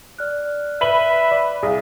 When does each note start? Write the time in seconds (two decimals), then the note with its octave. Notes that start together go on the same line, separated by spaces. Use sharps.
0.18 D5 F6 F#6
0.81 B4 E5 F#7
1.31 D5
1.63 C2 G#4 F5 D#6